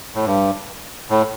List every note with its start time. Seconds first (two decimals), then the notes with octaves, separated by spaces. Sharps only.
0.15 A2
0.25 G2
1.10 A2